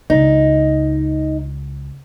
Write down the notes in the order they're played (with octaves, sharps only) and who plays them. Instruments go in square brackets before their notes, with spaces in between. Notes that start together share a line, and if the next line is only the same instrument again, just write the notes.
[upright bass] C#2 [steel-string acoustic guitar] D#4